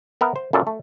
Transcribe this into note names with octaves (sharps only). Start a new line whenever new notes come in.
B3 A#4 E5
C5
F#2 A#2 A4
A3